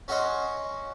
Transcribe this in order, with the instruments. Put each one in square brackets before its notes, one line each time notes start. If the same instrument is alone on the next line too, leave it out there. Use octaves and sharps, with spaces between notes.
[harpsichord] C#4 F#4 C#5 D#5 C6